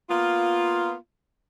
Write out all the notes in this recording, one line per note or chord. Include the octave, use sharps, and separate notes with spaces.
A#3 B3 F4